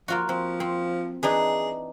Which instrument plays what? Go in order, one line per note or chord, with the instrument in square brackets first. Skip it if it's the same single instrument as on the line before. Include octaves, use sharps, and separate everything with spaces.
[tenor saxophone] F3 [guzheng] A#3 F4 F#4
[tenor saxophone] F3 [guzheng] C4
[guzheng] C4
[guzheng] E3 D4 D#4 [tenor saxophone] G#4